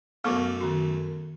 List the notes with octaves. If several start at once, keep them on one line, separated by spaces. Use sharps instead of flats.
F#2 A3 B3 C#6 D6
D#3 F#4